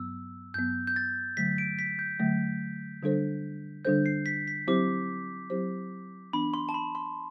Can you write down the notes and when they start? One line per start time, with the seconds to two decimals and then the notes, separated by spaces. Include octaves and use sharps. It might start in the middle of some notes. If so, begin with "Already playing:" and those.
Already playing: G2 F#3 B3 E6
0.54 G2 F#3 B3 G6
0.87 G6
0.96 A6
1.37 D3 F#3 A3 B6
1.58 D7
1.79 B6
1.99 G6
2.20 D3 F#3 A3
3.02 D3 G3 D4 A4 C5
3.85 D3 G3 D4 A4 C5 G6
4.06 C7
4.26 B6
4.48 B6
4.67 F#3 C4 E4 G4 C5 D6
5.50 F#3 C4 E4 G4 C5
6.33 E3 B3 D4 B5
6.54 C6
6.69 A5
6.74 B5
6.95 C6